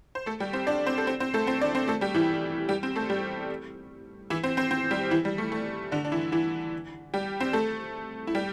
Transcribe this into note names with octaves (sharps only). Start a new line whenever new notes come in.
C5
A3 A4
G3 G4
C4 C5
D4 D5
C4 C5
A4
C4 C5
C4 C5
A3 A4
C4 C5
D4 D5
C4 C5
A3 A4
G3 G4
E3 E4
G3 G4
C4 C5
A3 A4
G3 G4
E3 E4
C4 C5
C4 C5
C4 C5
G3 G4
E3 E4
G3
A3
A3
D3 D4
D4
E3 E4
E3 E4
G3 G4
C4 C5
A3 A4
E4
G3 G4